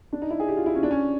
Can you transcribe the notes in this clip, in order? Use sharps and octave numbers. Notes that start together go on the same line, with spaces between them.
D4
D#4
E4
G#4
G4
F4
E4
C#4
D4
C#4